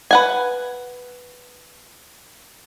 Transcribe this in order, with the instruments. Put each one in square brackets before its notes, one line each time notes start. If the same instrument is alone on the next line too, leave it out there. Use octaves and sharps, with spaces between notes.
[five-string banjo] B4 F#5 G#5